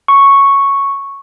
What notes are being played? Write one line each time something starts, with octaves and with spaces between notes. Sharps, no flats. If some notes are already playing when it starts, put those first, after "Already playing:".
C#6